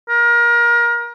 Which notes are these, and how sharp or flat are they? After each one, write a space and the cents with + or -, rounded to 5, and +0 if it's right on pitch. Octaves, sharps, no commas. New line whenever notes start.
A#4 +30